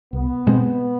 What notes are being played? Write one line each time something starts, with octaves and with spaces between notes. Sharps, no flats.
C2 B3
B2 G#3 C4